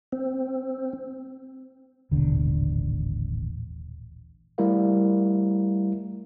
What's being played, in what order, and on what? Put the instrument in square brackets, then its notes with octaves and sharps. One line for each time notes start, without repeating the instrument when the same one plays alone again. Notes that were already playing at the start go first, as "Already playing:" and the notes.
[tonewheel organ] C4
[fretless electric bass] D#1 A1 B2 D3
[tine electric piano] G3 A3 E4 A#4 F5